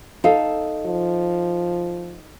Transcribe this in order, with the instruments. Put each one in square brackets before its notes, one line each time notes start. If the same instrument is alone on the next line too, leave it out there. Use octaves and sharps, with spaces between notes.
[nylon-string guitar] D#4 A4 F5
[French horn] F3